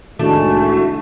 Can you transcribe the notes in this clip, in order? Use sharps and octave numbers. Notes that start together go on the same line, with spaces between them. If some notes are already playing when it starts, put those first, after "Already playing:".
C2 A2 D#3 G#3 A3 D4 F#4